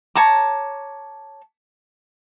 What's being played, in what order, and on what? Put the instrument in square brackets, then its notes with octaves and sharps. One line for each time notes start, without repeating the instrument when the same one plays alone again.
[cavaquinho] C#5 A5 A#5 D6